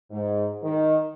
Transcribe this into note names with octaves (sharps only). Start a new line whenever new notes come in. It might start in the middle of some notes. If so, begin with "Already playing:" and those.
G#2
D#3